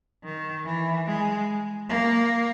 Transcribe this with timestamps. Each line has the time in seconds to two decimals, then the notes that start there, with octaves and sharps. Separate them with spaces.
0.24 D#3
0.65 E3
1.06 G#3
1.89 A#3